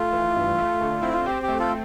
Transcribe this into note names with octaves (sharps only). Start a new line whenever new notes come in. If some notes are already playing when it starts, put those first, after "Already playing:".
Already playing: A3 F4
E3
G2
A3
D3
C4 E4
F4
C4 G4
G4
A3
F4 A4